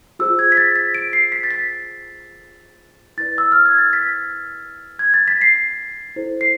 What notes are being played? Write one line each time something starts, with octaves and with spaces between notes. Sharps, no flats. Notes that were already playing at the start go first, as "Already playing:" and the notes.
F4 G#4 C5 E6
G#6
B6
A6
B6
D7
C7
B6
A6
B6
E4 B4 D5 A6
E6
F6
G#6
A6
B6
G#6
A6
B6
C7
E4 A4 C5
C7